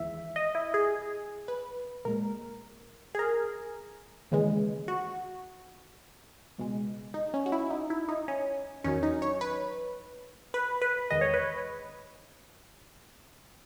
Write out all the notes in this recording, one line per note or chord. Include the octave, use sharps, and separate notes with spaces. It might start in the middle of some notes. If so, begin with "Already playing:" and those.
Already playing: D#2 E3 G#3 E5
D#5
E4
G#4
B4
A#2 G#3 A#4
G#4
A#4
D#2 C#3 E3 G#3
F#4
C#2 B2 G#3
D#4
C#4
F#4
E4
D#4
E4
D#4
C#4
E2 D#3 F#3 C#4
D#4
C#5
B4
B4
B4
E2 D#3 G#3 D#5
C#5
B4